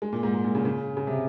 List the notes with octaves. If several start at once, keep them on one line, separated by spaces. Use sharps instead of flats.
G#3
A#2
G#2
G#2
A#2
C#3
C#3
C#3
C3